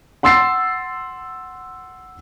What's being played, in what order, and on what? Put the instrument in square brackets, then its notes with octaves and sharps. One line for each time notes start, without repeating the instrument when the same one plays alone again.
[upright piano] F#5 C6 E6 A6 C7